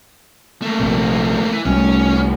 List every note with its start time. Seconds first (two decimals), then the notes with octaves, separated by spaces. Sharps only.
0.62 A3 A#3
0.80 A#1 C3
1.52 E3
1.65 C2 G3 A3 C#4